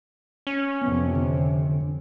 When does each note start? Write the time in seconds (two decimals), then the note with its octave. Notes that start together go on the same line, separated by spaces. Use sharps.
0.47 C#4
0.82 F2 C3 B3
1.15 D3